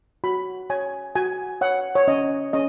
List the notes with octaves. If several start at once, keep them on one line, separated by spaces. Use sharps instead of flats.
F#4 B5
C#5 G#5
F#4 G#5
C#5 F#5
C#5
C#4 D#5
C#4 D#5